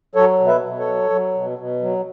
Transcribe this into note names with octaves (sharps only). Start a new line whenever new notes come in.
F#3 A4 C#5
B2
B4 E5
B2
A4 C#5
F#3
F#3
B2
B2
F#3